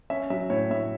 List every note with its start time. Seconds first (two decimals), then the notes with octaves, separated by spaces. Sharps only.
0.10 C#4 E5
0.30 F#3 E5
0.50 A2 C#5
0.71 A2 E5